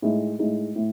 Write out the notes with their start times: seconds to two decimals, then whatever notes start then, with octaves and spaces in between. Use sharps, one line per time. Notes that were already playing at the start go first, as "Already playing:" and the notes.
0.02 A2 G#3 D#4
0.39 A2 G#3 D#4
0.76 A2